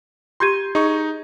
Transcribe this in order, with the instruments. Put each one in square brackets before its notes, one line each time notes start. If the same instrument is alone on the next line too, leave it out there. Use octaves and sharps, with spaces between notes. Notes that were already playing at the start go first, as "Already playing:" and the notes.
[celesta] F4 G4 D#7 [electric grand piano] C6 G6 G#6
[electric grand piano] D#4 C#6 [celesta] G#4